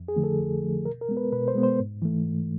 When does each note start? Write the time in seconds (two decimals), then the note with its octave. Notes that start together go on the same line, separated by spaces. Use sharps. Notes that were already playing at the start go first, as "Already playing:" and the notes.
Already playing: F2
0.08 G#4
0.16 D3 F3 A3
0.24 A4
0.39 F2
0.62 D3 F3 A3
0.85 B2 A#4
1.01 A#4
1.09 G#3 B3
1.17 B4
1.32 B2 B4
1.48 C5
1.55 G#3 B3
1.63 C5
1.79 G#2
2.02 E3 A3
2.25 G#2